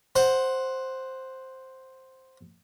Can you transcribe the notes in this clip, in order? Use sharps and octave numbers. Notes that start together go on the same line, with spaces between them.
C5 F#5